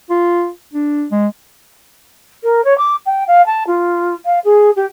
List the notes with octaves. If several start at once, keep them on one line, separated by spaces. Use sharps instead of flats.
F4
D4
G#3
A#4
C#5
D6
G5
F5
A5
F4
F5
G#4
G4